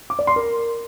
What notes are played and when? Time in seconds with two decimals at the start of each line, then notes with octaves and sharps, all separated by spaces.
0.10 D6
0.19 D5
0.27 C6
0.36 A#4